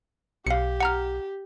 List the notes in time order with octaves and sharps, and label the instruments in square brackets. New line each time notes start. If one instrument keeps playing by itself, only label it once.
[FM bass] B1 [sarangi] G4 [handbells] F5 C#7
[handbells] F#5 A#5 F6